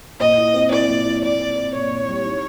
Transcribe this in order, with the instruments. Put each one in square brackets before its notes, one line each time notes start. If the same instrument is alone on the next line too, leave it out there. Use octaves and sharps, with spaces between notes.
[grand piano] A#2 [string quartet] D#5
[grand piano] E4
C4
[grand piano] E4 [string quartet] D5
[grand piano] A#2
E4
[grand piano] A#2 [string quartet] D5
[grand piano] C4
C4
[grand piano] A#2 [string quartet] C#5
[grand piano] A#2
G3
D#4